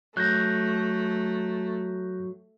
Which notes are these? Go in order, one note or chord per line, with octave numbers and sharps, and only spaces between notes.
F#3 A3 F#6 G6 A#6